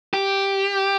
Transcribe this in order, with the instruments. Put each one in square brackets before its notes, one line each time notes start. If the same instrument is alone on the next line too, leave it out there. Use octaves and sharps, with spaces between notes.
[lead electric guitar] G4